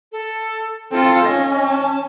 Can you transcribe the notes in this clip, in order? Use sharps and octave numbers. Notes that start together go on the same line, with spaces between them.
A4
C4 F4 A4
C#4 D#5
A5